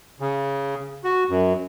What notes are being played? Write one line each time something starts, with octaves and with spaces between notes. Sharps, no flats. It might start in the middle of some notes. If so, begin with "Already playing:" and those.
C#3
F#4
F#2